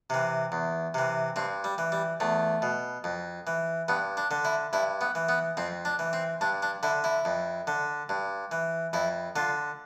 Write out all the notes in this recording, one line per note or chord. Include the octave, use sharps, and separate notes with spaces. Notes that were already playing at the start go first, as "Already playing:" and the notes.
C3 E3
E2
C3 E3
G2 C4
G3
E3
G3
E2 A3
B2
F2
E3
G2 B3
D4
D3
E4
G2 E4
B3
E3
B3
F2 C4
D4
E3
C4
G2 D4
D4
D3 E4
E4
F2
D3
G2
E3
F2 E4
D3 F4